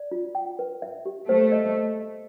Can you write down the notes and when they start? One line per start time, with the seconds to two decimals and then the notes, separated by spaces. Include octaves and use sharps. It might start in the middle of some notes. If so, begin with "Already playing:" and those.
Already playing: D5
0.12 F4
0.35 G5
0.59 B4
0.82 E5
1.06 G4
1.28 A3 C5
1.52 D#5